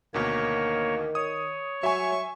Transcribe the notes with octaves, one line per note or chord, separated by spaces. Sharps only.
D2 B2 D#3 A#3 C#5
C#5 D#6
F#3 E5 G#5 C#6